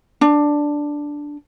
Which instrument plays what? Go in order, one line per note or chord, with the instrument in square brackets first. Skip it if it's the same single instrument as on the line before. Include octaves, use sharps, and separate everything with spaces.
[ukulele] D4